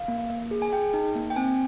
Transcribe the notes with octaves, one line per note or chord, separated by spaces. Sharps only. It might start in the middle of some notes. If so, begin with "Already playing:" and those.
Already playing: F5
A#3
A#3
G#4
G#5
G#4 G5
D#4
A#3
G5
C4 G#5